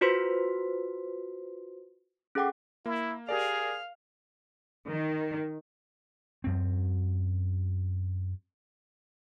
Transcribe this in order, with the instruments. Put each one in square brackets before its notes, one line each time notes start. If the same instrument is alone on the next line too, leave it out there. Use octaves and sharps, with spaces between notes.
[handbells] F4 F#4 B4 C5 C6 B6
C#4 G#4 A4 F#5 G5 D6
[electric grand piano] A#3 [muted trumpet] E4
[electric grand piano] G4 A#4 D5 [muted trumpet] G#4 [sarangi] F5
[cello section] D#3
[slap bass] F#2 C4